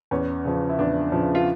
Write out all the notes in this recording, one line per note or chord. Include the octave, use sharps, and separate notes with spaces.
E2 C#4
C#3 F3
E4
E2 D4
C#3 F3
F4